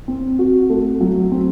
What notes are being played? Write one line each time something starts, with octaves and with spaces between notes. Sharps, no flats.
C4
F#4
A3
F#3
C4